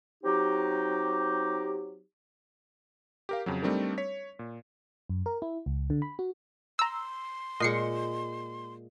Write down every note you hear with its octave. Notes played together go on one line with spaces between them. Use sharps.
F#3 C4 D#4 G4
G4 A#4 F5
F2 C#3 F#3
G3 A3 C4 D4 D#4 A#4
C#5 B6
A#2
F#2
A#4
E4
C#2
D3
B5
F#4
A#5 C6 E6
A#2 G#3 D#5 C7 C#7